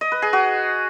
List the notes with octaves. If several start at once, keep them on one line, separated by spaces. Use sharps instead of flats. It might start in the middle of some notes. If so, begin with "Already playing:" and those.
D#5
B4
G#4
F#4